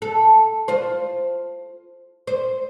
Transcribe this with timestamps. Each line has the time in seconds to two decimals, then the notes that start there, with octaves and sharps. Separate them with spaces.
0.02 A4
0.68 F4 C5
2.27 C5